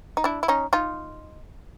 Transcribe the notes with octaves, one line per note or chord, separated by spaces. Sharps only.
D#4
D4 E4
E4
C#4 D#4
D#4 F4